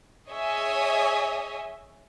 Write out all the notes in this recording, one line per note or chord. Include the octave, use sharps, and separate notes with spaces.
G#4 C#5 D#5 E5 G#5